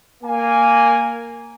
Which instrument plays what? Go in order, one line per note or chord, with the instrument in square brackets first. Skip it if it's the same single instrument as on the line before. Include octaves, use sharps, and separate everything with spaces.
[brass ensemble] A#3 G#5